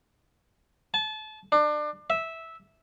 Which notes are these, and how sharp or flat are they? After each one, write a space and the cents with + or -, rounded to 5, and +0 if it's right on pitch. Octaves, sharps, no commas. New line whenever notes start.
A5 -30
D4 +30
E5 -10